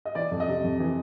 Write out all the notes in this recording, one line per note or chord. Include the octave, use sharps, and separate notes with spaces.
D#5
E3 D5
F2
D#5
C3
F2
E3